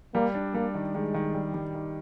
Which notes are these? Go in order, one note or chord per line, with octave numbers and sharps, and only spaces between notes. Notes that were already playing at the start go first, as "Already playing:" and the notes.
G3 A#3
D4
G3 A#3
D#3
D#3 G#3
D#3
G3
G3
D#3